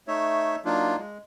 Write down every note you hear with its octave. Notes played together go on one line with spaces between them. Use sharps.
A3 D#4 C#5 E5
F#3 A#3 D4 D#4 F4
G#3